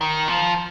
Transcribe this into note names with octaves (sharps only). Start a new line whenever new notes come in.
D#3
F3